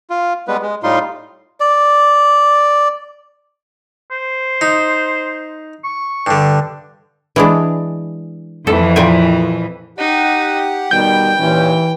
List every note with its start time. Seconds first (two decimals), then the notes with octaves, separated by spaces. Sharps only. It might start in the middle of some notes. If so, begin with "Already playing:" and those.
0.10 F4
0.48 G3 G#3 B3 B4
0.62 G#3
0.83 A2 G3 D#4 F4 C6
1.60 D5
4.11 C5
4.61 D#4
5.84 C#6
6.27 G2 D3
7.36 E3 G#3 D4
8.67 F2 E3 A4
8.96 A#2 G5 G#5
9.98 D#4 G4 F#5
10.91 B2 D#3 G3 G5 G6
11.39 D#2 A#2 E3 C#4